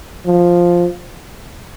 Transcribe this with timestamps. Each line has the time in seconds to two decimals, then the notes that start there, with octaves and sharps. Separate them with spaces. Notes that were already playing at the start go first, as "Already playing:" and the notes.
0.26 F3